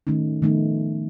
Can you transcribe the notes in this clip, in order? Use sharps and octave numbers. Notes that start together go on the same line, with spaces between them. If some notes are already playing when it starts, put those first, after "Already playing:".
D#3 A3 C#4 D#4
D#3 F3 A3 B3 D#4